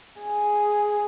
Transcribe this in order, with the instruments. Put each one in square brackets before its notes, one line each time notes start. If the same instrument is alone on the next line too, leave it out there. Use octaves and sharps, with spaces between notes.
[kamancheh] G#4